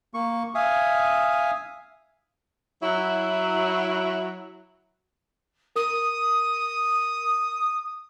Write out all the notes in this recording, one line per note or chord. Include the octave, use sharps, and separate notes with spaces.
A#3 C#6
E5 F5 G#5 D#6
F#3 E4
A#4 D#6